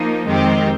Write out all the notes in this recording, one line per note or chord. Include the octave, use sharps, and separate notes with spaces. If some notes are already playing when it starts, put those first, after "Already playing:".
Already playing: F3 A#3 D#4
F2 D#3 G#3 C4 G4